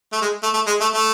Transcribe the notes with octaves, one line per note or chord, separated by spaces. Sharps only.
A3
G#3
A3
A3
G#3
A3
A3